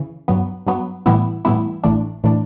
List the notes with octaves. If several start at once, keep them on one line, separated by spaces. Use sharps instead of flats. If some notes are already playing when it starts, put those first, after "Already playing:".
Already playing: C#3 E3
G2 F#3 B3
G2 F#3 B3
A2 E3 G3 B3 E4
A2 E3 G3 B3 E4
A1 A2 E3 A3 D4
A2 E3 A3 D4